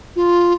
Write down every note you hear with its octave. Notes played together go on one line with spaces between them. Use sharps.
F4